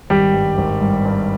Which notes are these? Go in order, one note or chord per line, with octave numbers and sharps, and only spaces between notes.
G#1 G3 G4
G2
G#1
G2
G2